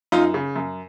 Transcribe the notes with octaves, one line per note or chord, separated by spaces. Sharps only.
F#2 D#4 F4
C#3
F#2